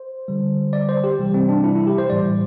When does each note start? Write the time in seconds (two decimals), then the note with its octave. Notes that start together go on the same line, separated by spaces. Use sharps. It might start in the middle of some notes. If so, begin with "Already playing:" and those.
Already playing: C5
0.28 D3 G3
0.73 D5
0.89 C5
1.04 G4
1.19 C3 E3 G3
1.34 C4
1.49 D4
1.64 E4
1.76 E4
1.87 G4
1.98 C5
2.09 A2 E3 G3 D5